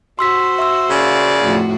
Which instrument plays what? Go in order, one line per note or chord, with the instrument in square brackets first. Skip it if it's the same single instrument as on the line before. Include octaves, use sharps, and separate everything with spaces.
[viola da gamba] F#4 C5 [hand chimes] C6 E6 B6
[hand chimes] E5 C6 E6
[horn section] A#2 C#3 D5
[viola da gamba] F2 A2 F#4